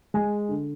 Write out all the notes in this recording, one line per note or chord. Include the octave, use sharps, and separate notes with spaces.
G#3 G#5
D3